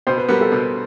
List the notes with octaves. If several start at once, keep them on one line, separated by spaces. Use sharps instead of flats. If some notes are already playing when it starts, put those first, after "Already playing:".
B2 C5
B4
G3 B3 A#4
A4
B2